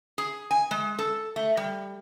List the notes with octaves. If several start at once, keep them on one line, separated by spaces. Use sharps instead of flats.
G#4
G#5
G#3
A4
A3
G3